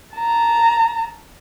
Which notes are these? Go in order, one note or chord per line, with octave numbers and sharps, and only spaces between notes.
A5 A#5